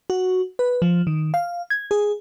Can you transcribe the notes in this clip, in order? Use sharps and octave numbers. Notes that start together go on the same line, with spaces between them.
F#4
B4
F3
D#3
F5
G#6
G#4